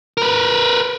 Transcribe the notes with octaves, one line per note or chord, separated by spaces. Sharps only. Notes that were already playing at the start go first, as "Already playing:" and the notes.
A#4 B4